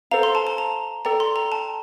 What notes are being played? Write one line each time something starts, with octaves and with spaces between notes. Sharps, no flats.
A4 C5 F5 A#5
C6
A5
A5
A#5
A4 D5 G5 A#5
C6
A#5
A5